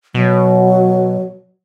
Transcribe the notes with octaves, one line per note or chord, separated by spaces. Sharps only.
B2 F#3